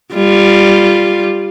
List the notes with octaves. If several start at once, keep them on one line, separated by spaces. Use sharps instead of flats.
G3 F4